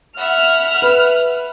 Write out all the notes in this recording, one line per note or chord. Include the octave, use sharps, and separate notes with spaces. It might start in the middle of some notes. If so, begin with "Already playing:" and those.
E5 F#5 B5 F6
B4